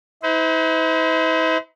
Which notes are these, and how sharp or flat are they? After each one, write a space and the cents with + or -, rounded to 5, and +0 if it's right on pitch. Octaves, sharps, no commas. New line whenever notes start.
E4 -45 C5 -40